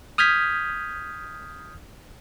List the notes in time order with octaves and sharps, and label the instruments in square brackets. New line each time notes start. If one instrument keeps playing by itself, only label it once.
[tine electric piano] D#6 F6 G6 G#6 B6